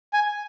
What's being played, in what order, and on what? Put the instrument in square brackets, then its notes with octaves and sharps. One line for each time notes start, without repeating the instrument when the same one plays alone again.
[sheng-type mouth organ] G#5